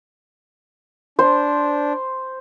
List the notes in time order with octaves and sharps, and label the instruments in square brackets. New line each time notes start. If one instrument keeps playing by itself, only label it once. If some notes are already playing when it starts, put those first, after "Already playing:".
[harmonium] D4 [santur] C5